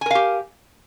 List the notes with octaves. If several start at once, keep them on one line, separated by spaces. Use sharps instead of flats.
G4 A#4 F5 G#5